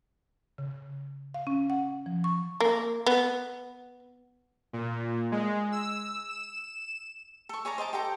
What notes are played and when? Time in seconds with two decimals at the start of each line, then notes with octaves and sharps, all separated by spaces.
0.58 C#3
1.34 F5
1.47 C#4
1.70 F#5
2.06 F3
2.24 C#6
2.60 A#3
3.06 B3
4.73 A#2
5.32 G#3
5.72 E6
6.29 E7
7.49 A4 C#6
7.65 G#4 C#5 D5 A#5
7.78 C5 D#5 A5 D6
7.93 G4 A4 G5 A#5